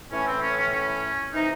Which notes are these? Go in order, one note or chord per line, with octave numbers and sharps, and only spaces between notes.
A2 E3 C#4
C4
C#4
C#4
C#4
C3 E3 D#4